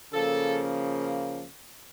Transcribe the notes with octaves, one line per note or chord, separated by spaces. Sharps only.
C#3 F3 A#3 A4